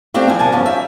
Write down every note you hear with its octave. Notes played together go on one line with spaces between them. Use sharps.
A3 C4 D4 F4 G4
E2 F3 E5 G#5
C3 G3 A#4 G#5 A5
E2 G2 F3 C#4
D#4 F4 C#5 E5